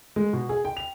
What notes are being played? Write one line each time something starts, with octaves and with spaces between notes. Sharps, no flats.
G#3
B2
G#4
G5
F7